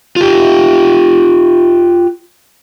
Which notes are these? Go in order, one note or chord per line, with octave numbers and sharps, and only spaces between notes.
F4 G4